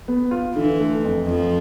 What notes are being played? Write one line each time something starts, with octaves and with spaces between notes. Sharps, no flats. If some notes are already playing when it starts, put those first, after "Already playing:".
B3
F4
D3 E3
A3
F2
F2 F3